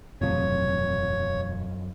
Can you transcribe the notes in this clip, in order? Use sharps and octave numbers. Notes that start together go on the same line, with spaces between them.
E1 F#2 A2 C3 F3 F#3 C#5